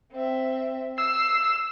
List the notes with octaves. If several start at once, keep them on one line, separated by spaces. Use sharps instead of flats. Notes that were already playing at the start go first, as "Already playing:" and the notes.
C4 E5
E6 C7